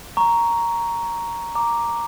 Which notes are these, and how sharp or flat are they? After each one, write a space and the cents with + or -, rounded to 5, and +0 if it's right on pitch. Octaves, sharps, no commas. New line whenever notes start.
A#5 +0 C#6 +10
A#5 +0 D6 +0